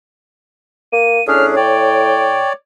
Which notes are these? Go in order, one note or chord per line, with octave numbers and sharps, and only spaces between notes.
A#3 D#7
A2 C#4 D4 G#4 F6
C#5 D5 G5